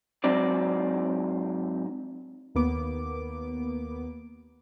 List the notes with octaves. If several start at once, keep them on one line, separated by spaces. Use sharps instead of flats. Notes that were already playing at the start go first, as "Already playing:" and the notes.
G#2 F#3 C4 D#4 D5
D#2 A#3 B3 D6